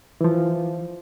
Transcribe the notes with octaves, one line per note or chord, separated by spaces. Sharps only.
E3 F3